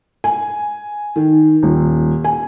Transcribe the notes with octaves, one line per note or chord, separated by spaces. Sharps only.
G#5
D#3
D#1
G#5